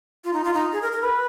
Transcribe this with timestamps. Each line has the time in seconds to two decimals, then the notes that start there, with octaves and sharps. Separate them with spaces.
0.24 F4
0.33 D#4
0.44 F4
0.54 D#4
0.73 G#4
0.82 A#4
0.92 A#4
1.01 B4